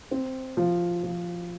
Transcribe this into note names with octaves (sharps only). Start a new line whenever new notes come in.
C4
F3
F3